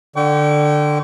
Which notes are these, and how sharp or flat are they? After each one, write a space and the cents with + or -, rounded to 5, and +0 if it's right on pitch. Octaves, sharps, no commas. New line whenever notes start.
D3 +10 G5 -30 C#6 +40